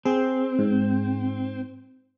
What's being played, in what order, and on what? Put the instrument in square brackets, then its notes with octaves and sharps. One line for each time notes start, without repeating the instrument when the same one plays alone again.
[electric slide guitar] C4 [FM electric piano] G#4
[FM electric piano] G#2